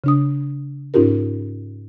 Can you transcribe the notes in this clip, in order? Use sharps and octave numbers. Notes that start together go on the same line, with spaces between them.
C#3 D4 D#6
G#2 C#4 D#4 F4 G4 A#4